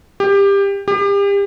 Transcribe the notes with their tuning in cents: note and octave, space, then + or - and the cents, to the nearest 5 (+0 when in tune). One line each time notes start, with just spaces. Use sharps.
G4 +20
G4 +35